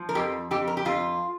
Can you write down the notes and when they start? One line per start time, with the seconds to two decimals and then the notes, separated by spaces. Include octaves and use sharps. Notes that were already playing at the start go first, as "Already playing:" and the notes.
Already playing: F3
0.09 A#4
0.15 F2 G4
0.51 F2 G4
0.67 A#4
0.77 G4
0.85 F2 F4